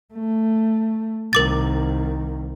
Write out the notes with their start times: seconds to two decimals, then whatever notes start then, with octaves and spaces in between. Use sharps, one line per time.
0.14 A3
1.33 C2 D#3 A#4 D6 A6